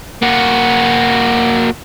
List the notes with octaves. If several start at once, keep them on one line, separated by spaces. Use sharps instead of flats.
A#3 F#4